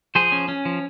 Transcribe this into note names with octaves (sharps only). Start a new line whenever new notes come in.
F3 G#4 C5
C#4
C#4
F3